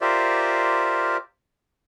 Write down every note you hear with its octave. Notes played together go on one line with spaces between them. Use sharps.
F4 G4 A#4 C5 D5 E5